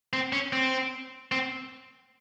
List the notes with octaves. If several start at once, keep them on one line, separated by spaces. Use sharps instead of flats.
C4
C#4
C4
C4